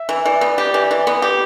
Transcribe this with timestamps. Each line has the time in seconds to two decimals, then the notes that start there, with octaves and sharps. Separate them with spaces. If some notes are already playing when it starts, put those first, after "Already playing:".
Already playing: E5
0.09 E3
0.25 E3 D5
0.41 B3
0.58 G4
0.74 E3
0.91 E3
1.07 B3
1.22 G4